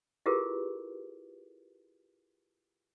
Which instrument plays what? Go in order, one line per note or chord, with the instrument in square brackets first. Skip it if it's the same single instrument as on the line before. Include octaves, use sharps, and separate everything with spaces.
[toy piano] E4 F4 G4 G#4 A#4 B4